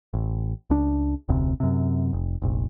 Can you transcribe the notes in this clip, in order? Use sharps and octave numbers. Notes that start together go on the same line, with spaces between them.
A1
C#2 D4
F1 D2 C3
F#2 C3
F1
F1 A#1